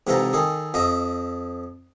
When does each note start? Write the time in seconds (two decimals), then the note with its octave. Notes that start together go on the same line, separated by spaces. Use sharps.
0.07 G#2 C3 E3 F4 A4 A#5
0.33 D#3 G#4 A4
0.74 F2 F3 D#5 E5